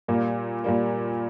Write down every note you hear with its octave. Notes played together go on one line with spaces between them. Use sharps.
A#2 G3 A#3
A#2 G3 A#3